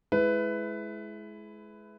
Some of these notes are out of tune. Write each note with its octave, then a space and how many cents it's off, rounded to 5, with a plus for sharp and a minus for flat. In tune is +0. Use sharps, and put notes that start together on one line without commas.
G#3 +30 E4 +0 B4 +15